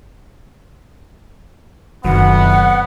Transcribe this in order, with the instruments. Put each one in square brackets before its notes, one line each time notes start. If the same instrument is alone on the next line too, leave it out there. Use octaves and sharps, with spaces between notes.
[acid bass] F1 [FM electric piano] F#2 D#3 F#3 [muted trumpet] B3 [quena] F#5